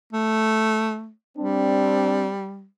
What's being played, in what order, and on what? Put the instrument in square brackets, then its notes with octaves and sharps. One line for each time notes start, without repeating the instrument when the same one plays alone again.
[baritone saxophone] A3
[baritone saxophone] G3 [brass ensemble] C4 D4